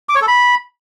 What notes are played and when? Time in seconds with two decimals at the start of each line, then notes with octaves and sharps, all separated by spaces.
0.09 D6
0.15 C#5
0.21 A4
0.28 B5